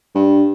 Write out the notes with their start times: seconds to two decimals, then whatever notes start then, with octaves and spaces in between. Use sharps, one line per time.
0.15 G2